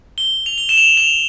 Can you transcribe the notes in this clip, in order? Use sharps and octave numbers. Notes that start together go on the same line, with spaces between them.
G7
F7
G7
E7
F7
F7